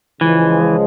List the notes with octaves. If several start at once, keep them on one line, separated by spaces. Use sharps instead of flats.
C#2 C#3 E3 F3 G#3